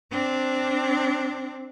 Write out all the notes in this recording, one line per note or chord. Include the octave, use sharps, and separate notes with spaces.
C4 D4